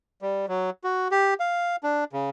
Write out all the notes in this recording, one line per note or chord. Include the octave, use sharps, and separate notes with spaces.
G3
F#3
F#4
G4
F5
D4
C#3